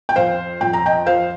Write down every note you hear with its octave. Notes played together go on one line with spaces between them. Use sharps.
G5
F2 C5 F5
F2 G5
A#5
D#5 G5
F3 C5 F5